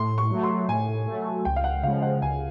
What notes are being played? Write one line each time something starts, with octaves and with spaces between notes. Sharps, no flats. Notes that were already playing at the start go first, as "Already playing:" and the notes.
Already playing: A2 C6
C#6
F#3 A3
C6
A2 G#5
A3
F#3
C#2 G5
F5
F#5
C#3 F3 G#3 F5
F#5
C#2 G#5